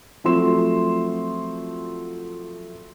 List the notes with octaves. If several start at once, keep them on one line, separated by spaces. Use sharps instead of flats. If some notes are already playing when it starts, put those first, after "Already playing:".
F3 F#3 A3 C4 C6 E7